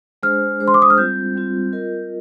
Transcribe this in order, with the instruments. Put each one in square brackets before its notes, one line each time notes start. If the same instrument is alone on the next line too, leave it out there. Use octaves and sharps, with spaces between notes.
[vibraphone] G#3 D4 G#4 C5 [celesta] F6
[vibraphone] G#3 D4 G#4 C5
[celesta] C6
D6
D#6
F6
[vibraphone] G3 C4 F4 [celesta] G6
[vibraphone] G3 C4 F4
F4 A#4 D#5